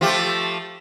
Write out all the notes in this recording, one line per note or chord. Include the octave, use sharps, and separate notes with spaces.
F3 A3 G4